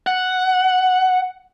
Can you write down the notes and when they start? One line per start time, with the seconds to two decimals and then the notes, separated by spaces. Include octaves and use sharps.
0.07 F#5